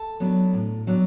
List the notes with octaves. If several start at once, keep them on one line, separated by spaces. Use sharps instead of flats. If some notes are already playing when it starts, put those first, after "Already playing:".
Already playing: A4
F#3 B3 D4
A2
F#3 B3 D4